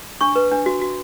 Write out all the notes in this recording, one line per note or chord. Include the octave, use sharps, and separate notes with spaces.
D4 C#6
B4
D4
F#4
F#4